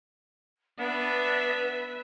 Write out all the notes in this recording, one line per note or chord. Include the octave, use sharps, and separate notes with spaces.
B3 D4 B4 E5